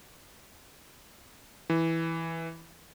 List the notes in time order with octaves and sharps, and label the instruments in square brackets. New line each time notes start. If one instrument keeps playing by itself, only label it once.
[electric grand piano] E3